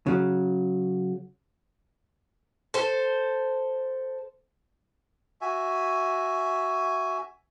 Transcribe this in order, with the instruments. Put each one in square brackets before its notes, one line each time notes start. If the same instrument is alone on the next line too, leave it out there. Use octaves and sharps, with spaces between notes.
[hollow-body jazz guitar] C#3 F#3
[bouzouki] A4 C5
[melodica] F#4 E5 G#5